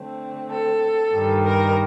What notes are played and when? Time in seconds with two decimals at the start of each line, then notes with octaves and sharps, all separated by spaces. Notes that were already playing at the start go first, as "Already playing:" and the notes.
Already playing: D3 A3 C4
0.50 A4
1.13 G2 D#3 G3
1.44 A#4